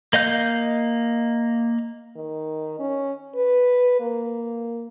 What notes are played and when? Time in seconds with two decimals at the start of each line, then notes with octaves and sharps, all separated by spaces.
0.13 A#3 D#5 F5 G6
2.16 D#3
2.79 C#4
3.35 B4
4.00 A#3